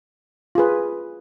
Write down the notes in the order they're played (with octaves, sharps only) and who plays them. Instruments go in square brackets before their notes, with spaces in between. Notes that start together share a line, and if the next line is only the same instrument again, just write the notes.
[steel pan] F4 G#4 B4